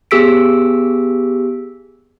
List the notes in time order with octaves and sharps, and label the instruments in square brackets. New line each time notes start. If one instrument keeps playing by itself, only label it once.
[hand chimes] B3 G4 G#4 E6 B6 D7